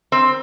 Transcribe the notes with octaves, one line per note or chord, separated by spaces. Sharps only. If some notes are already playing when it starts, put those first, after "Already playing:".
C4